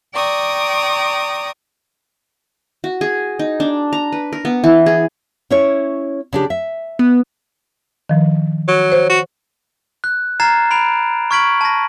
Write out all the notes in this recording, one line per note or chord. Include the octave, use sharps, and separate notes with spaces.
D5 G5 A#5 C#6 D#6
F#4
G#4
D#4
D4
A#5
B4
A#4
B3
E3
G#4
C#4 E4 C#5
C#3 D4 G4
E5
B3
D#3 F3
F#3
C5 C#5
F#4
F#6
A#5 F6 G#6 A6 C7 E7
B5 D7 F7
C#6 F6 G#6 B6 D7 F#7
A5 A#6